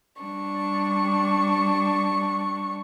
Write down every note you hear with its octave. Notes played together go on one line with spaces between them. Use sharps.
G3 D4 C#6